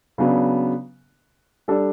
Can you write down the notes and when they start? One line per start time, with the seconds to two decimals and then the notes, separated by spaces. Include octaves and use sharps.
0.18 C#3 F#3 B3 D4
1.68 G3 D4 A4